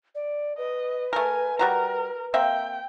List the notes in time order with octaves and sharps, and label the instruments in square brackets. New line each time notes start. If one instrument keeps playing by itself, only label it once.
[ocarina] D5
[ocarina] B4 [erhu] D#5
[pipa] A3 A#4 [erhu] G#5
[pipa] G3 F#4 A#5 [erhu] A#4
[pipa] A#3 C4 E5 [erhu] G5